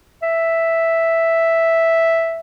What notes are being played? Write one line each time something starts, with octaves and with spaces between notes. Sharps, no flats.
E5